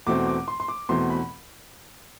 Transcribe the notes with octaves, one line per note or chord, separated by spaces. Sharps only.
E2 B2 A3 C4 D6
D6
C6
C6
D6
E2 B2 A3 C4 C6
B5